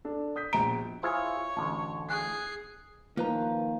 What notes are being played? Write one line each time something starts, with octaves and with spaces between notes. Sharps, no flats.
D4 A4
D#6 G6 B6
A#1 B2 A#5 D7
E4 F4 G#4 C5 C#5 G#5
A1 D2 A5
G#4 G#5 F#6 C7
D#3 F3 A#3 B4 A#5